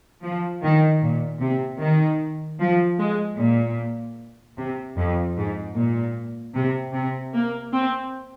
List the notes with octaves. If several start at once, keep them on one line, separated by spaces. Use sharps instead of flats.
F3
D#3
A#2
C3
D#3
F3
G#3
A#2
C3
F2
G#2
A#2
C3
C3
A#3
C4